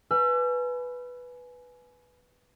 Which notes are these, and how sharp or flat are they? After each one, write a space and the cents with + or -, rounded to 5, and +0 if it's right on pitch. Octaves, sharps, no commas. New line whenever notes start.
B4 +0 G#5 +25 E6 +40